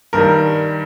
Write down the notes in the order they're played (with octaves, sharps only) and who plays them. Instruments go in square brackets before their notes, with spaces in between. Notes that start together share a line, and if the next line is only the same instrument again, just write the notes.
[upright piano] G2 D#3 G3 A#4